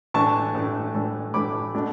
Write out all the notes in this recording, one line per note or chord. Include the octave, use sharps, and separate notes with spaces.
A2 E3 A3 D4 A5 C#6
A2 E3 A3 D4
A2 E3 A3 D4
A2 E3 A3 D4 B5 D6
B2 A3 D4